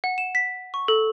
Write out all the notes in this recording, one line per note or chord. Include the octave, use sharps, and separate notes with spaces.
F#5
E7
B6
C#6
A4